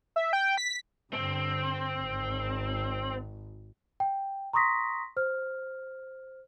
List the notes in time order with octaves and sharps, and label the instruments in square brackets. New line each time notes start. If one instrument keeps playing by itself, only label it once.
[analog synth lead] E5
G5
B6
[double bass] G2 D3 [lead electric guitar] C4
[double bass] G#1
[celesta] G5
A#5 C6 C#6 D#6 A#6 B6
C5 F6